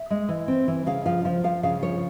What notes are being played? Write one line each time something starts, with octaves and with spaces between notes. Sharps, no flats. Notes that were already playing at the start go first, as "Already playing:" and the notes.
Already playing: E5
G#3
E3
C4
E3
C#3 F5
F3 F5
F3 F5
F3 F5
C#3 F5
F3 C#5